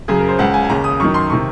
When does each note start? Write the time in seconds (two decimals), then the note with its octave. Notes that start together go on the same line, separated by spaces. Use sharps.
0.08 F#2 C#3 G#4
0.19 A#4
0.29 C5
0.39 C#2 C#3 F#5
0.54 G#5
0.64 G#5
0.69 D#2 C#3 A#5
0.84 D#6
1.00 F#2 D#3 C#6
1.14 C6
1.30 C3 D#3 C#6